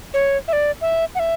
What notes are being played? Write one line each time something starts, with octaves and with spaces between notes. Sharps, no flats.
C#5
E5
D5
E5
F#5
E5